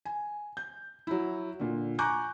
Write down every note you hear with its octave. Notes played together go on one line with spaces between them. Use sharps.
G#5
G6
F#3 E4
A#2 D3
G#5 A#5 C#6 D6 F#6 G6